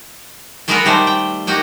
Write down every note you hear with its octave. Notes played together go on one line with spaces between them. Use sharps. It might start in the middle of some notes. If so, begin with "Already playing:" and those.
F#3 G#3 B3 F#4 G#4 A#4
D#3 G3 A3 C5
G5
A#3 D#4 F#4 G4